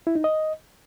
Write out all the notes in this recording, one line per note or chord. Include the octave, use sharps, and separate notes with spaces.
E4
D#4
D#5